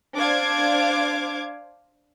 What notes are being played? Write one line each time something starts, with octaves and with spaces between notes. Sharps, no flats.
D4 C5 F5 D6 G#6